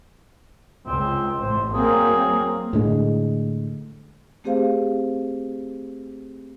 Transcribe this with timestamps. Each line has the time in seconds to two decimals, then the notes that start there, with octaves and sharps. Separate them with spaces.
0.87 C#2 C4
1.41 A1 A2 C5
1.74 F#3 A#3 C4 G#4
2.73 A2 D3 G#3
4.44 A3 C4 G4 G#4 C5 F5